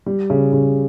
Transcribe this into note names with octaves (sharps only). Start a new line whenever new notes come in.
G3
C#3
C#3